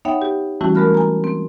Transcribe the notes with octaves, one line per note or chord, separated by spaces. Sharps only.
B3 D#4 C#5 E5 F#5 G5
G4
E3 G3 A3 C#4 E4 F#4
G#3 A3 A#4 B5 F6 F#6
G#5 A#5
C4